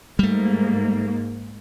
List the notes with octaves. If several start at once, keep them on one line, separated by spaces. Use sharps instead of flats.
G#2 G3 A3 A#3